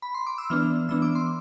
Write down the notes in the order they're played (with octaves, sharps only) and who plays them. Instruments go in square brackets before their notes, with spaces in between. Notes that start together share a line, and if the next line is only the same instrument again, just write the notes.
[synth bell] B5
C6
D6
E6
E3 B3 D4 F6
E3 B3 D4 E6
D6
C6